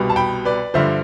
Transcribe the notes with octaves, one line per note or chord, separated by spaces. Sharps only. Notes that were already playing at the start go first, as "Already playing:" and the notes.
Already playing: C2 B2 G3 B3
A5
G5 B5
B4 D5
G2 D3 F3 C5 E5